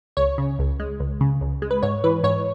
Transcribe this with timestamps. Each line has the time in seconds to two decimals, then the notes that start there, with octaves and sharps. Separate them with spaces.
0.17 C#2 C#5
0.38 C#3
0.59 C#2
0.80 G#3
1.00 C#2
1.21 C#3
1.41 C#2
1.62 G#3
1.71 B4
1.83 G#2 C#5
2.04 E3 B4
2.23 G#2 C#5